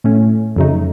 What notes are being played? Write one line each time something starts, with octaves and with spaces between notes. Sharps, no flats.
A2 A3 C#4
F2 C#3 F#3 A3 D#4